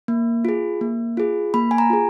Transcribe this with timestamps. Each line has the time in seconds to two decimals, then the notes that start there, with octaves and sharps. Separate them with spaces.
0.08 A#3
0.45 F4 G#4
0.81 A#3
1.17 F4 G#4
1.54 A#3 B5
1.71 G#5
1.78 A#5
1.90 F4 G#4